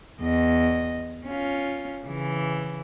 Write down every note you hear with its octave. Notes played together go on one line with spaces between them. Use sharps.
E2 D#5
C#4 F4
C#3 E3